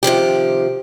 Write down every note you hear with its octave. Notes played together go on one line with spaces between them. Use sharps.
C3 D#3 F3 G4